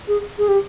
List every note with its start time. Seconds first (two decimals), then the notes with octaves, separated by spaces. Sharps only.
0.08 G#4
0.38 G#4
0.48 G4